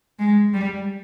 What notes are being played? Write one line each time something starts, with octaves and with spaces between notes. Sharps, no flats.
G#3
G3